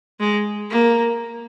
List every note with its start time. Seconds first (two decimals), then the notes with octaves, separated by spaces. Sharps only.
0.20 G#3
0.71 A#3